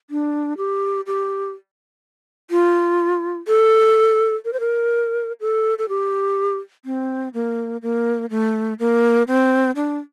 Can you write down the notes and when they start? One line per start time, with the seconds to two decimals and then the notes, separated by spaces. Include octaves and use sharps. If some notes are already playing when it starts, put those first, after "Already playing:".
0.10 D4
0.57 G4
1.07 G4
2.51 F4
3.48 A4
4.45 A#4
4.53 C5
4.60 A#4
5.41 A4
5.78 A4
5.89 G4
6.85 C4
7.34 A#3
7.82 A#3
8.30 A3
8.79 A#3
9.28 C4
9.76 D4